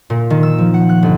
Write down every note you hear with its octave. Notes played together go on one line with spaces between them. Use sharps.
A#2
D#3
E6
F3
F#5
F#6
G1